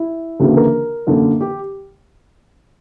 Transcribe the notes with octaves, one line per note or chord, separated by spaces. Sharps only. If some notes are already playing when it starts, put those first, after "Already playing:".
Already playing: E4
D2 C#3 E3 A#3 F#4
A#4
F#2 D3 A#3
G4